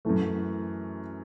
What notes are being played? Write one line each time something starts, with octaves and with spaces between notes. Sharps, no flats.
F#2 E3 A3